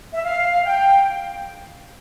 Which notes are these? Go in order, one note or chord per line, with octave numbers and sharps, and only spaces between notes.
E5
F5
G5